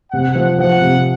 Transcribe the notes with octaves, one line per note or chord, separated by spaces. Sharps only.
C3 F#5
F3
F3 F#5
C3